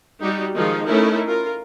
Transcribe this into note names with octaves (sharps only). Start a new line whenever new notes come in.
G3 D#4 F#4 G4
D#3 F3 G#3 D#4 F4
A3 C#4 D#4 E4 A#4
F4 A#4